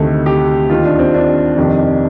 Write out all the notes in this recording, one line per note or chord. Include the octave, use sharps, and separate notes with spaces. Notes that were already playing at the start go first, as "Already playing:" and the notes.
Already playing: D2 C3 D#3 A3
G4
D#2 D#3 F4
D4
C4
D4
F2 C3 D#3